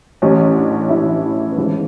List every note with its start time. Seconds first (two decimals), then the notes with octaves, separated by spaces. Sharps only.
0.22 A1 A2 E3 C#4
0.56 D4
0.89 A1 A2 E3 E4
1.52 B3
1.57 G#1 G#2 E3 C#4